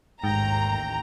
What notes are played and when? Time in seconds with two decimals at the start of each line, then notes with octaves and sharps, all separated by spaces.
0.24 A1 D#2 G#2 G5 A#5